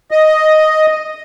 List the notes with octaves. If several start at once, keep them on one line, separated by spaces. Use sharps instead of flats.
D#5